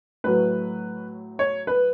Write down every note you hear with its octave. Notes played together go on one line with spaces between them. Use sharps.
A2 F#3 A3 B4
C#5
B4